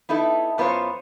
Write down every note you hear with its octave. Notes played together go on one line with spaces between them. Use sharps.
B3 D#4 E4 A4
F#2 B3 F4 C5 C#5